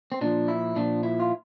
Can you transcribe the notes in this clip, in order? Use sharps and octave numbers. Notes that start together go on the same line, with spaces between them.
C4
A#2 F3 D4
E4
A#2 F3 D4
E4
F4